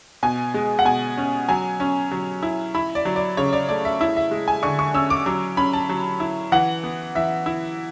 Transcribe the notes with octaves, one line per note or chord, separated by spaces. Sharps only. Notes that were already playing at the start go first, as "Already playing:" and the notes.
B2 G#5
G#3
F#5
B2 G#5
C#4
F#3 G#5
C#4
F#3
E4
E4 B5
D5
F#3
D5
C#3 C#5
D5
A3 D5
E5
E4 E5
E5
G#3
G#5
D3 C#6
C#6
C#4 E6
D6
F#3 D6
C#4 B5
A5
F#3
E4
E3 F#5
B3
E3 E5
E4